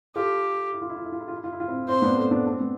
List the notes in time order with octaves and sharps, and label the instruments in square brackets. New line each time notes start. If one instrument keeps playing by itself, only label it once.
[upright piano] F4 A4 [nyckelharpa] G4
[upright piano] E4
F4
E4
F4
E4
F4
E4
F4
E4
F4
E4
F4
C4 E4
[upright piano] C4 E4 [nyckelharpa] C5
[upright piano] B3 D4
A3 C4
B3 D4
D4
C4
B3